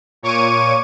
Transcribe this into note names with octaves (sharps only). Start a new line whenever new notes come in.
A#2 C#5 C#6 D6 D#7